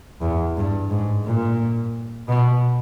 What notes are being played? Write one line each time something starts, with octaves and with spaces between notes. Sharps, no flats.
E2
G2
G#2
A#2
B2